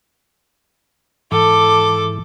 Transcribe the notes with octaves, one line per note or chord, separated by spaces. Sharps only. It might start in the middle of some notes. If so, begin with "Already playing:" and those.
G#2 E3 A4 D6